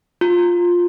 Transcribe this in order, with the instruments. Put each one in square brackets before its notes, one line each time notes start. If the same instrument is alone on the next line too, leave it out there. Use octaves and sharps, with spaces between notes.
[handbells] F4